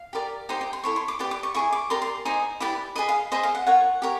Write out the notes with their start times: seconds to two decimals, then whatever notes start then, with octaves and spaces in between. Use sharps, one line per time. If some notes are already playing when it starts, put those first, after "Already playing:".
Already playing: F5
0.13 G4 A#4 D5
0.49 D#4 G4 C5 G5
0.61 G5
0.73 C6
0.83 E4 A4 C#5 C#6
0.96 C6
1.08 D6
1.19 G4 B4 D5 D6
1.31 D6
1.43 C#6
1.54 E4 G#4 C#5 C#6
1.72 D6
1.90 G4 A#4 D5 C6
2.02 C6
2.25 D#4 G#4 C5 D#5
2.60 E4 G4 B4 D5
2.96 G#4 B4 D#5 B5
3.09 F5
3.32 G#4 C5 D#5 E5
3.43 F5
3.55 F#5
3.67 F4 A#4 C#5 F#5
4.02 G4 A#4 C#5